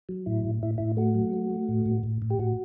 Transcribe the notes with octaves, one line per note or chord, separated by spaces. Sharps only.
F#3
A2 E4
A2
A2 E4
A2 E4
A3 F#4
F#3
A3
A3
A2
A2
A2
A2
G4
A2 F#4